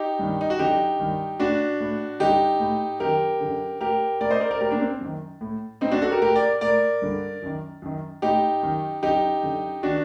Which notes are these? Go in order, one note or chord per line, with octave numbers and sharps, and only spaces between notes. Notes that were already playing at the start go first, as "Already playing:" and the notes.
Already playing: D#4 G4
G2 D#3
D#4
F#4
F#2 D3 D#4 G4
G2 D#3
A2 D4 F#4
A2
G2 D3 D#4 G4
A2
F#2 D#3 G4 A#4
F#2 D3
A2 G4 A#4
A2 A#4 D5
C5 D#5
A#4 D5
A#4 D5
A2 G4 A#4
A#3 D4
C4
F#2 D#3
A2
A2 C4 D#4
D4 F#4
F#4 A4
G4 A#4
A2 G4 A#4
A#4 D5
A2 A#4 D5
G2 D3
F#2 D#3
F#2 D#3
A2 D#4 G4
F#2 D#3
F#2 D3 D#4 G4
F#2 D3
D#3 D4 F#4